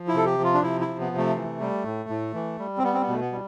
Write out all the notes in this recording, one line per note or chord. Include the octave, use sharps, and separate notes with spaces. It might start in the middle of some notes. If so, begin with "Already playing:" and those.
Already playing: F3
E4
C3 A4
G4
F3
F4
D4
C3 E4
E4
F3
B3
C3
A3
E3
G3
A2
A2
E3
G3
C4
G3 B3
C4
B3
B2 A3
B3
G3